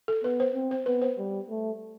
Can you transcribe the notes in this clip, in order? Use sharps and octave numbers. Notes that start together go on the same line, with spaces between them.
A4
B3 B4
C5
C4
C5
B3 B4
C5
G3
A3